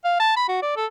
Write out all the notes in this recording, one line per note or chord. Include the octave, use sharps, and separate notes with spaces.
F5
A5
B5
F#4
D5
A4